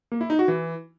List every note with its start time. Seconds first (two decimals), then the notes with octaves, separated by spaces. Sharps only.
0.12 A#3
0.21 E4
0.30 D#4
0.39 F#4
0.48 E3